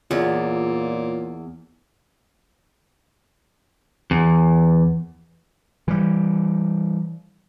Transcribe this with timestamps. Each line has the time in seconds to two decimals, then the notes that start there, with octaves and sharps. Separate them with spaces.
0.11 E2 A#2 F4 C#5 D5
4.11 E2
5.88 E3 G3